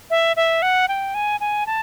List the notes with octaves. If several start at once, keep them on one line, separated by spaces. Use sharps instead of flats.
E5
E5
F#5
G5
G#5
G#5
A5